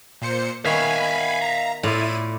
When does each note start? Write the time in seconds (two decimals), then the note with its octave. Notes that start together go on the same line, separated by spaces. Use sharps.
0.21 A#2 C5 C#7
0.65 D#3 B3 C#5 E5 F5 G#5 B5
1.41 A#5
1.83 A2 E4 F4 D5 D#7